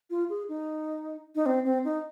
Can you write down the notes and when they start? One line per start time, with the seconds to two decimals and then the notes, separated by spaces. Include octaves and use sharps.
0.10 F4
0.30 G#4
0.49 D#4
1.35 D#4
1.46 C4
1.65 C4
1.85 D#4